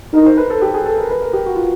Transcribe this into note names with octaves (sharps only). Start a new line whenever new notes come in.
D#4 A#4
C5
B4
A4
G4
G#4
A4
A#4
B4
A#4
G4
F#4
F4